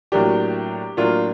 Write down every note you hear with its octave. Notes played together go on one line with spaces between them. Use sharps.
A2 F#3 A#3 D4 G4
A2 F#3 A#3 D4 F4